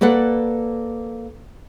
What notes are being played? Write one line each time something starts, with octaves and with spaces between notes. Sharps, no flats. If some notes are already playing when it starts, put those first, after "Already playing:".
A#3 A4 B4 D5 F#5